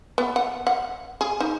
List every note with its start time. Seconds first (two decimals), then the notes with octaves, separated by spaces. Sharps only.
0.18 B3
0.36 F#5
0.67 F#5
1.21 G#4
1.40 D#4